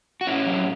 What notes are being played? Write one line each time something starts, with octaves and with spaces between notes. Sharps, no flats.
F#4
A2 C#4 E4
F#3